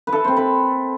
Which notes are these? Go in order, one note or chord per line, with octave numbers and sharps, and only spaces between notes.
B4
E4 A4
C4 C5
B4